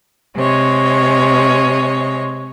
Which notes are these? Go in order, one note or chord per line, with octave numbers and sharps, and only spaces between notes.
C3 G#3 C#5